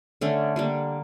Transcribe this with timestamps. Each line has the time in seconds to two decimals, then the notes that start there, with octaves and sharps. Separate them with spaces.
0.21 D3 A3 C#4
0.56 D3 G3 A#3